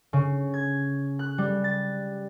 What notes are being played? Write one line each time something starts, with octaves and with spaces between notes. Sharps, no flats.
C#3
G#6
F#6
G3
A6